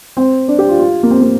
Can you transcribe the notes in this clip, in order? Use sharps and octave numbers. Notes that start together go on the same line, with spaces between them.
C4
D4
G4
F4
F4
A#3
C4
A#3